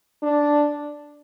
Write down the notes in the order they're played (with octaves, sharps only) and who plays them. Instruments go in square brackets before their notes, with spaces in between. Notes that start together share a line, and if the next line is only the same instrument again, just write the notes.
[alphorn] D4